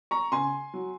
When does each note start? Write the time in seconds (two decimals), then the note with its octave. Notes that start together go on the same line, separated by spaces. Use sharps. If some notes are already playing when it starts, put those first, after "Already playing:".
0.11 A#5 C#6
0.32 C#3 G#5 C6
0.74 F#3